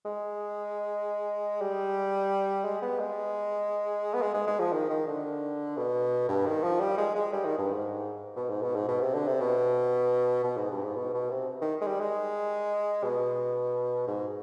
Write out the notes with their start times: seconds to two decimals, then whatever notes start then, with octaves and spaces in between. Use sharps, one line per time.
0.06 G#3
1.61 G3
2.65 G#3
2.82 B3
2.99 G#3
4.14 B3
4.22 G#3
4.34 G#3
4.47 G#3
4.60 F3
4.73 D#3
4.90 D#3
5.08 D3
5.77 B2
6.29 G2
6.46 D#3
6.64 F3
6.80 G3
6.98 G#3
7.15 G#3
7.33 G3
7.45 D#3
7.58 G2
7.72 G#2
8.36 B2
8.49 G#2
8.62 B2
8.75 G#2
8.88 B2
9.01 C3
9.14 D3
9.27 C3
9.40 B2
10.44 B2
10.57 G#2
10.70 G2
10.83 G#2
10.96 B2
11.14 B2
11.30 C3
11.61 D#3
11.81 G#3
11.87 G3
12.00 G#3
13.04 B2
14.08 G#2